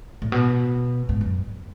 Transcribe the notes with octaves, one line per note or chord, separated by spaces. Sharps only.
A2
B2
G#2
F#2